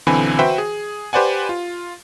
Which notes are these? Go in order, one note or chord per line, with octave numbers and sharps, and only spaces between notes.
B1 D3 E3 C4 G#5 B5
F#4 B4 C5 E5 G5
G#4
G4 B4 C5 D5 F#5 G#5
F4